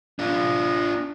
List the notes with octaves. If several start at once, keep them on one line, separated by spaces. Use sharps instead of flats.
D4 F4